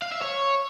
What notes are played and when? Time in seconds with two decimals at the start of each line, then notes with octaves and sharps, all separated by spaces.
0.02 F5
0.12 E5
0.21 C#5